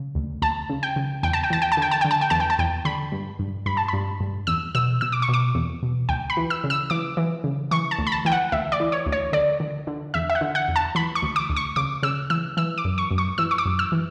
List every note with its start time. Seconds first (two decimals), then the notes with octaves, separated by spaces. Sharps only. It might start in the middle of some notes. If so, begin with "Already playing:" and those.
Already playing: C#3
0.15 D2
0.42 D2 A5
0.70 C#3
0.83 G5
0.96 C#3
1.23 E2 G5
1.33 A5
1.43 G5
1.50 E2 A5
1.62 G5
1.72 A5
1.77 D3 G5
1.91 A5
2.01 D3 G5
2.11 A5
2.21 G5
2.30 E2 A5
2.40 G5
2.50 A5
2.59 E2 G5
2.85 D3 B5
3.12 G2
3.39 G2
3.66 G2 B5
3.77 A5
3.88 G2 B5
4.20 G2
4.47 E2 E6
4.75 B2 E6
5.01 B2 E6
5.12 D6
5.22 C#6
5.29 B2 D6
5.55 E2
5.83 B2
6.09 D2 G5
6.30 B5
6.37 E3
6.50 E6
6.64 C#3
6.70 E6
6.90 E3 D6
7.17 E3
7.44 C#3
7.71 E3 C#6
7.91 A5
7.99 D2
8.07 B5
8.12 A5
8.25 E3 G5
8.32 F#5
8.52 D2 E5
8.72 D5
8.80 E3
8.92 C#5
9.06 D2
9.12 C#5
9.33 D3 D5
9.60 D3
9.87 D3
10.14 E2 E5
10.30 E5
10.35 F#5
10.41 D3
10.55 F#5
10.68 E2
10.76 A5
10.95 E3 B5
11.15 C#6
11.22 D2
11.36 D6
11.50 D2
11.56 C#6
11.76 C#3 D6
12.03 C#3 E6
12.30 E3 E6
12.57 E3 E6
12.78 D6
12.85 F#2
12.98 C#6
13.11 F#2
13.18 C#6
13.38 E3 E6
13.51 C#6
13.58 D6
13.65 F#2
13.79 E6
13.92 E3